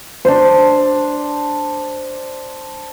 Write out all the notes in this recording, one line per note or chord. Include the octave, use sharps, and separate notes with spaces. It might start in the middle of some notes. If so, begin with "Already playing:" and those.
D4 C5